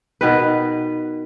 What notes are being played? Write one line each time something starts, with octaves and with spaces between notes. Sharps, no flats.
B2 D#3 B4